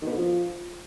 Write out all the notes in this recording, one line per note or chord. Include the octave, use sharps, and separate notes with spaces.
D#3
B2
D3
F3